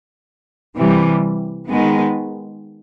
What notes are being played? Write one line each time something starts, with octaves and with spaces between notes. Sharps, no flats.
C3 E3 G3
D#3 G#3 B3